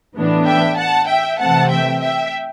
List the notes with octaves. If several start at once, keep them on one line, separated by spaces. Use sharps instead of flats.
A2 E3 B3 D4
E5 G5
F#5 A5
E5 G5
C3 E3 A3 C4 F#5 A5
E5 G5
E5 G5